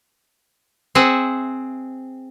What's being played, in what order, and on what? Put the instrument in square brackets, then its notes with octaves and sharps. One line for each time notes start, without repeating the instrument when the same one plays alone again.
[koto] C4 G#4 E5 F#5